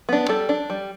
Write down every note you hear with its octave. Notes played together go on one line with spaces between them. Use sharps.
B3 D4
G3 A4
D4
G3